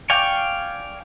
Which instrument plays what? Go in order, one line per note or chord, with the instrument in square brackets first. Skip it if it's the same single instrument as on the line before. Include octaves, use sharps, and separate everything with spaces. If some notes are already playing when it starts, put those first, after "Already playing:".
[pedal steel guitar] D5 F5 G5 G#5 C#6